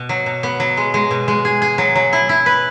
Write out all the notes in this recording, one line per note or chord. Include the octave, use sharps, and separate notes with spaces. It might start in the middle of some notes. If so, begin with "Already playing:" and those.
Already playing: B2
F#3
B2
B3
F#3
G#3
G#3
B2
G#3
G#4
G#4
F#3
F#3
E4
E4
B4